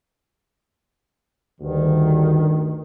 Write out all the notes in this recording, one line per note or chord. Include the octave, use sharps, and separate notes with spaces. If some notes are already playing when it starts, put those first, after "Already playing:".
D2 G2 D#3